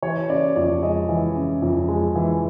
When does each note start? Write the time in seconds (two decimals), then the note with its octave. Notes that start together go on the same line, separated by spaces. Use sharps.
0.02 E3 C#5
0.29 C#3 D5
0.56 F2 D5
0.83 G#3 D#5
1.09 E3
1.36 C#3
1.62 F2
1.88 G#3
2.16 E3